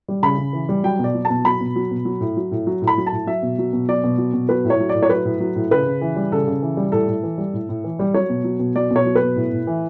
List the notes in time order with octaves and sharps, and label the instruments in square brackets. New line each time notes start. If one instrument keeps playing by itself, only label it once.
[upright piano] G3
C#3 B5
C#3
E3
G3
F#3 G5
B2
D5
F#3
A5
B2
F#3 B5
B2
F#3
B2
F#3
A2
F#3
A2
F#3
A2
B5
F#3
A5
A2
F#3 E5
B2
F#3
B2
F#3 D5
B2
F#3
B2
F#3 B4
A2
C#5
F#3
D5
A2
C#5
F#3 B4
A2
F#3
A2
C#3 B4
C#3
E3
G3
C#3 A4
C#3
E3
G3
A2 A4
A2
E3
G3
A2
A2
E3
G3
F#3 C#5
B2
F#3
B2
F#3 D5
B2 C#5
F#3
B4
B2
A2
A2
E3